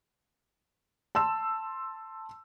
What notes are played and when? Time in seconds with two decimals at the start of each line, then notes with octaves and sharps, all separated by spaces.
1.15 A5 C6 E6